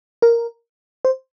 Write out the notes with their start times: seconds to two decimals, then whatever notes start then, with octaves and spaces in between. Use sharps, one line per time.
0.22 A#4
1.05 C5